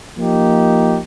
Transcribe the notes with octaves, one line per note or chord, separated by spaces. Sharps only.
F3 A#3 D#4 G4